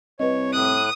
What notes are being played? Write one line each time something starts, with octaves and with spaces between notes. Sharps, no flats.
C2 B4 C#5 D#5
A2 D#6 F#6